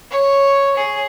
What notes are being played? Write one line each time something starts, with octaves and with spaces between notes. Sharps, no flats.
C#5
G#4